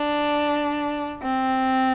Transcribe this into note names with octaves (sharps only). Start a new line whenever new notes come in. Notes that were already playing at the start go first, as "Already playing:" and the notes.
Already playing: D4
C4